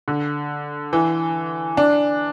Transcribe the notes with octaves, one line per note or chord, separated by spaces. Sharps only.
D3
E3
D4